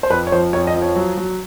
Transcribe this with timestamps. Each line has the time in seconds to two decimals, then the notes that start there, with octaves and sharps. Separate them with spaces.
0.03 C5
0.10 F2 B4
0.27 C#5
0.32 F3 C5
0.53 F2 C#5
0.67 D#5
0.74 F3
0.82 C#5
0.96 F#3
1.17 F#3